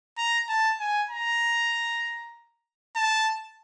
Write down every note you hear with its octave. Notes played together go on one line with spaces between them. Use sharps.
A#5
A5
G#5
A#5
A5